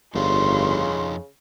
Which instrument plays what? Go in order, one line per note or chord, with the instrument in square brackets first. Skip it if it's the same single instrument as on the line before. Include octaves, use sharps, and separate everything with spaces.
[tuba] G1 [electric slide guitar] F2 D#4 F4 [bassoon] C#3 [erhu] C6